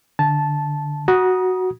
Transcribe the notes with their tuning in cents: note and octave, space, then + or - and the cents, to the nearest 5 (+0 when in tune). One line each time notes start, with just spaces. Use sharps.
D3 +0 A5 -10
F#4 +0 A#5 +45 D#6 +0